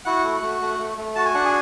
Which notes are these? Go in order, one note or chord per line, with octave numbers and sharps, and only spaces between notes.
E4 F#4 F#5
A3
A3
A3
A3
A3
F#4 A5
G#5
D4 F#5
G#4 G#5